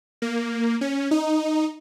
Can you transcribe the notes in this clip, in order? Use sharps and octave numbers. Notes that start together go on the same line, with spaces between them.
A#3
C#4
D#4